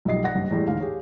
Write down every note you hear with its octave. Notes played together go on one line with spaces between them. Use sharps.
B1 F3 G3 D#5 C7
D5 F#5 A#6
F#1 G2
E2 A2 G3 G#3
D2 G#2 F5
G4 G#4 C#5